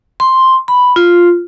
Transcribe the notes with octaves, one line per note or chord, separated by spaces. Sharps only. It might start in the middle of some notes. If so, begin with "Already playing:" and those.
C6
B5
F4